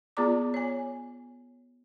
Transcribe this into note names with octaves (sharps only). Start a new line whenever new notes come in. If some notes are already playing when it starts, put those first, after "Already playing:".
B3 F4 G#4 D5 A#5 D6
C#5 G#5